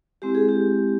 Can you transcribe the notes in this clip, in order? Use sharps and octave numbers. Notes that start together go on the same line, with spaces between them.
G#3 C4 E4 G4
G#4
G4